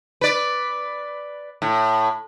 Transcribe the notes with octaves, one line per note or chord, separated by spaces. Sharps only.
B4 D5
A2